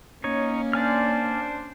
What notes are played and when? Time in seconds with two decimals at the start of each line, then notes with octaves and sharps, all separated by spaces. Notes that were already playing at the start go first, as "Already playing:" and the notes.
0.24 A#3 C#4 D#4 C#5
0.73 D4 C5 D5 G#5 F6